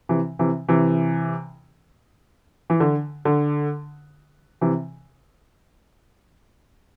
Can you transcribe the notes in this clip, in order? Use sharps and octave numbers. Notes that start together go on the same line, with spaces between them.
C3 E3
C3 E3
C3 E3
E3
D3
D3
C3 E3